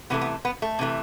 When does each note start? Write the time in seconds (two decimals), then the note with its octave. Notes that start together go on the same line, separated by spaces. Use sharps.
0.10 C3 E3 A3 B3
0.21 B3
0.45 B3
0.62 A3
0.79 C3 E3 A3